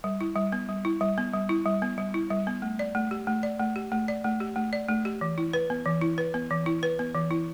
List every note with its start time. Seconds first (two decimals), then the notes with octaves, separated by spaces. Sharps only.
0.04 G3
0.21 E4
0.36 G3
0.52 B3
0.69 G3
0.85 E4
1.01 G3
1.18 B3
1.33 G3
1.49 E4
1.66 G3
1.82 B3
1.98 G3
2.14 E4
2.30 G3
2.47 B3
2.62 A3
2.79 D5
2.95 A3
3.11 G4
3.27 A3
3.43 D5
3.60 A3
3.76 G4
3.92 A3
4.08 D5
4.24 A3
4.40 G4
4.56 A3
4.73 D5
4.89 A3
5.05 G4
5.21 E3
5.38 E4
5.53 B4
5.70 B3
5.85 E3
6.01 E4
6.18 B4
6.34 B3
6.51 E3
6.66 E4
6.83 B4
6.99 B3
7.14 E3
7.31 E4